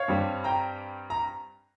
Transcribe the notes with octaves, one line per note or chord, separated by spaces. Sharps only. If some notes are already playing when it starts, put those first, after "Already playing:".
Already playing: C#5 F5
G2 G3 C4
G5 A#5
A#5